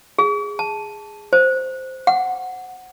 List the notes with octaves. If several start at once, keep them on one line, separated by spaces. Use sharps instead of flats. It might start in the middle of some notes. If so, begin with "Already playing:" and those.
G#4
A5
C5
F#5